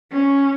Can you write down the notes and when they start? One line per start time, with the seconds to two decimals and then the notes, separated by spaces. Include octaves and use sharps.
0.12 C#4